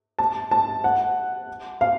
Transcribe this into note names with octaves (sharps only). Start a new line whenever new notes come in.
A5
A5
F#5
F5